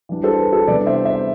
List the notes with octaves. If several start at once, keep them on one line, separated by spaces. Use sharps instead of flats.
E3 G3 D4
A4 C5
B4
A4
C3 E3 G3 B3 D4 B4 D5
C5 E5
C5 E5